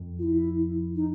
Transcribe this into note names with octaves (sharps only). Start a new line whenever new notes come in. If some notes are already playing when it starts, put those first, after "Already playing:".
Already playing: F2
F4
E4
D#4